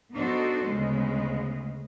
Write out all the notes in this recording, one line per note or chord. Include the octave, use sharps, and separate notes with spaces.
B3 D4 D#4 F#4 A4 C5
D2 C#3 G#3 B3